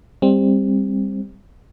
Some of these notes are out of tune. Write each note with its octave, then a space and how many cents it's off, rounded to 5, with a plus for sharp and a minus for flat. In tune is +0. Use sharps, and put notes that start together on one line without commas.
G3 +25 C4 +15